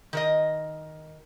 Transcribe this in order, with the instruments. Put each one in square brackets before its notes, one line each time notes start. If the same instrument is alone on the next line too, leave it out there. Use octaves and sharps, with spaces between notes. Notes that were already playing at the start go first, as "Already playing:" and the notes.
[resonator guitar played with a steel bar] D#3 A#4 D#5